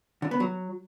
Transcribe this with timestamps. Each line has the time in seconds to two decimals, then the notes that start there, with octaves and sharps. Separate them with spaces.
0.22 D3
0.31 B3
0.40 F#3